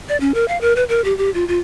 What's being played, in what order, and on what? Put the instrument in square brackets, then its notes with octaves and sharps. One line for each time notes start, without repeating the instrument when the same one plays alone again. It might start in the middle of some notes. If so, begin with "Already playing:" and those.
[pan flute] D5
C#4
A#4
F5
A#4
B4
A#4
G4
G4
F4
F4